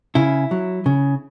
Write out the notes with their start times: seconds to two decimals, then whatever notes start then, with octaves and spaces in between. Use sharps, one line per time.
0.15 C#3 E4
0.51 F#3
0.86 C#3